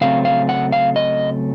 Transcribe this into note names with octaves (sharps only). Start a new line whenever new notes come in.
C#3 F#3 A3 C4 F5
F5
F#5
F5
D#5